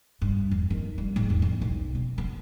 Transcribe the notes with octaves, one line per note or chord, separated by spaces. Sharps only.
G2
E2
D#3
G3
G#2
E2
E3
B1
C4
B3